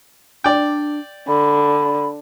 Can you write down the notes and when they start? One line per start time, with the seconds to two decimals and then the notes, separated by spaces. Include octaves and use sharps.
0.44 D4 D5 G5
1.28 D3 B5